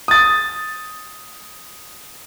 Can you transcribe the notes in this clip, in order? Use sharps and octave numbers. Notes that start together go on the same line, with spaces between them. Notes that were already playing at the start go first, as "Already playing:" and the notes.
D#6 A6